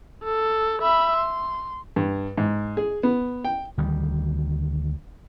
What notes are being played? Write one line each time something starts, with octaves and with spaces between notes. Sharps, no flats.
A4
E5 B5
C6
G2
G#2
G#4
B3
G5
D2 D#3 G3